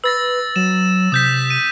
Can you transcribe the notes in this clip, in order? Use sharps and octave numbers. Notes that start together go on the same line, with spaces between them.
B4 E6 A6 A#6
F#3 E7
C3 D#6 G6 B6
D#7